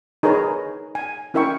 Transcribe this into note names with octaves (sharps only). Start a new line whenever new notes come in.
D#4 G#4 A#4 B4 C#5 A#5
G#5
C#4 E4 A#4 E5 G5 C#6